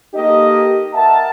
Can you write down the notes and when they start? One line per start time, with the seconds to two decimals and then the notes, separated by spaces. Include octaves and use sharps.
0.14 A#3 D#4 G4 A4 D#5
0.94 A#4 E5 F#5 G5 A5